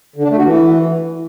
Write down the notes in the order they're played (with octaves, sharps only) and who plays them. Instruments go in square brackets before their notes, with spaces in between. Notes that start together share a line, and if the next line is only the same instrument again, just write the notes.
[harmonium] D3
D4
A3
F#4
E3